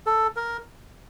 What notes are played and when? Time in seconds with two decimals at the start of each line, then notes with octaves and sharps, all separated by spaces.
0.06 A4
0.36 A#4